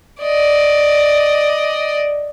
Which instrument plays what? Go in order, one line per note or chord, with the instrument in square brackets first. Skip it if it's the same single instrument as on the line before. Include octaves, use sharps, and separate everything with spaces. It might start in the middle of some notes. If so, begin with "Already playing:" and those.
[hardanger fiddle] D5 D#5